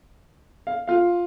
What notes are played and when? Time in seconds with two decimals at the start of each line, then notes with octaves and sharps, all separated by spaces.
0.67 F5
0.88 F4 F5